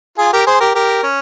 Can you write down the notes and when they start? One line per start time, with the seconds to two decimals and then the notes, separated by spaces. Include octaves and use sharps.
0.18 F4 G#4
0.33 G4 A#4
0.47 G#4 C5
0.60 G4 A#4
0.75 G4 A#4
1.03 C#4